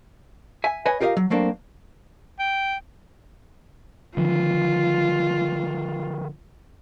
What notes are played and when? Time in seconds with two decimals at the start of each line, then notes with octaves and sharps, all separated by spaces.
0.64 E5 G#5
0.86 B4 C#5 D#5 G#5
1.00 F4 G4 A#4 D#5 F5
1.17 F#3
1.30 F#3 A3 A#3 C4 D4
2.39 G5
4.17 D3 D#3 F3 F4